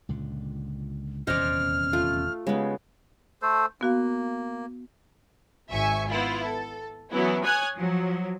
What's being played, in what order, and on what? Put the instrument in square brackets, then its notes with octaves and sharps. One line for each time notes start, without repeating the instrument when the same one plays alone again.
[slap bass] C#2 A#2 D3
[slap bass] D#1 E2 [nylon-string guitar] C3 C#4 D#5 [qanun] C5 D5 [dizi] F6
[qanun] A3 F4
[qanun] C#3 B3 [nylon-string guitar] G#3 G4
[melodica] A3 A4 C5
[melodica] A#3 [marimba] B3 F#4 F5
[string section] G#1 E5 G#5 C#6
B3 E4 F4
A4
E3 F#3 B3 C#4 E4
C#5 G#5 D#6 F#6 G#6
F3 F#3